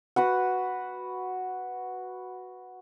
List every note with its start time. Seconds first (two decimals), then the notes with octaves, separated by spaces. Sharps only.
0.16 F#4 B4 F#5